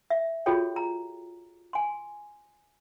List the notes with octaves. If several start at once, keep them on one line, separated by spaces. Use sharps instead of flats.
E5
F4 F#4 G#4 A4 C#5 G5
A#5
G#5 C6